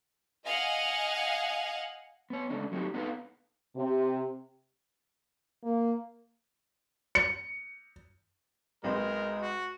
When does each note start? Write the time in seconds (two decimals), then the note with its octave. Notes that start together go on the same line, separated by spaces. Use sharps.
0.44 D#5 F5 F#5 G#5
2.30 B3 C#5
2.50 C#3 G#3 A3 C#4 D4
2.72 F#3 A3 C4 C#4 D#4 G4
2.94 B3 D4 D#4 A4 B4 F5
3.76 C3
5.64 A#3
7.15 C#7
8.84 B1 G#3 C4 A#4
9.41 F#4